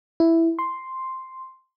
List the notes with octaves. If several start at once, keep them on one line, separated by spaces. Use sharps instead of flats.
E4
C6